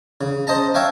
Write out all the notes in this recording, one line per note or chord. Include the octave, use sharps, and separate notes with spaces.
C#3
C5 D#5 A5 A#5
C#5 E5 F5 G5 D6